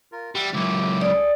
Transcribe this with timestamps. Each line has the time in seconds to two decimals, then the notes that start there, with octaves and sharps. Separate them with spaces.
0.12 F4 A#4
0.35 G3 E5 F#5 E6
0.54 C#2 F#2 E4 G4
1.01 G#4 A4 D5